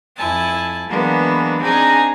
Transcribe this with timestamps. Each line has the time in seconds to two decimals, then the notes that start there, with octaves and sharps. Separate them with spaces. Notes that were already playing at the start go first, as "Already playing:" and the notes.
0.16 F2 E4 G#5 A5
0.89 E3 F#3 G#3 A#3 B3 D4
1.61 C4 D4 D#4 G#4 G#5 A#5